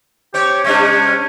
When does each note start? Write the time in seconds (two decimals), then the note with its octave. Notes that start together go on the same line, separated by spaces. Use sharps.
0.34 C4 G4 C#5
0.64 C3 G3 C#4 D4